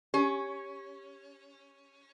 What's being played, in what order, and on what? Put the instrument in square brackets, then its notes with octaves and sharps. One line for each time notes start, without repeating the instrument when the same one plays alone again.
[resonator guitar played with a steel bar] C#4 [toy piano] G4